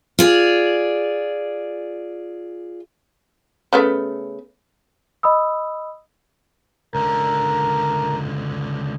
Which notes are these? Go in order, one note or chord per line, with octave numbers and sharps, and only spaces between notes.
F4 G#4 D5
C#3 A3 B3
D#5 B5 D#6 E6
C#2 D3 A#4